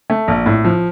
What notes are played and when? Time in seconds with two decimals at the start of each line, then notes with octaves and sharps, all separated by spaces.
0.10 A3
0.28 A#1
0.46 A2
0.64 F3